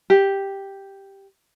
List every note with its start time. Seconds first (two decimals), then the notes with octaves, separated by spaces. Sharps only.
0.10 G4